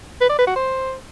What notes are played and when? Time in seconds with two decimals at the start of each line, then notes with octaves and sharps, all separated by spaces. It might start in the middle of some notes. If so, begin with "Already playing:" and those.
0.21 B4
0.30 D5
0.38 B4
0.47 F#4
0.56 C5